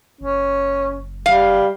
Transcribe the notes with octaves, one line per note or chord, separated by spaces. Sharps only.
F#1 C#4
G3 F5